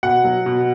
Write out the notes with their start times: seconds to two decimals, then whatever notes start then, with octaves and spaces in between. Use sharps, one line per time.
0.03 B2 F#5
0.24 F#3
0.46 B2